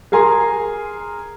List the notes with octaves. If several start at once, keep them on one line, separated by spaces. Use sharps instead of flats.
G#4 A#4 G#5 A#5 C6